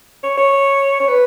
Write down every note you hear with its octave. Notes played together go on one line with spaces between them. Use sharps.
C#5
C#5
C#5
B4